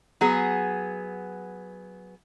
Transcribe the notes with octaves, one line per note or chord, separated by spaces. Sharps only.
F#3 B3 G#4